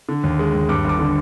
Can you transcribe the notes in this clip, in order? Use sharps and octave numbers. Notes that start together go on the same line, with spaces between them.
D3
D#2
G#3
D#2
G2 D6
G1
D6
D3